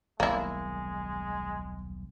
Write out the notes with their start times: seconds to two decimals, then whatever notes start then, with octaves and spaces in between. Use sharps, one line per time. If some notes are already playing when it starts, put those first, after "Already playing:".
0.20 D#1 B1 G#3 A#3 E4